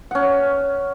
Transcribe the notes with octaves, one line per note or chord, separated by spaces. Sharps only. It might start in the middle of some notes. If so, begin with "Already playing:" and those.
C#4 F#5